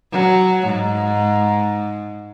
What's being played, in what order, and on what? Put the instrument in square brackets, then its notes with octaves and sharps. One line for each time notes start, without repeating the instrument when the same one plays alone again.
[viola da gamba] F#3
G#2